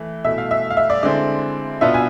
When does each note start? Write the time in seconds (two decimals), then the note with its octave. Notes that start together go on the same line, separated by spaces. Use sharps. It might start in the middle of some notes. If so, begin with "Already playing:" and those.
Already playing: E3 A3 E4
0.24 B2 A3 E4 E5
0.38 F5
0.51 E5
0.70 F5
0.77 E5
0.90 D5
1.03 D3 G#3 C4 E4 D5
1.81 B2 B3 D4 F4 E5
1.94 G#5